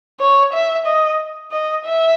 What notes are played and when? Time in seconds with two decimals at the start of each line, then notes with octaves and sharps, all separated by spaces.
0.20 C#5
0.53 E5
0.86 D#5
1.52 D#5
1.84 E5